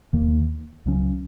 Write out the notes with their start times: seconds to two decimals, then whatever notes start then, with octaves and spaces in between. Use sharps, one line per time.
0.13 D#2 D#3 A#3
0.86 C#2 C#3 F#3 C#4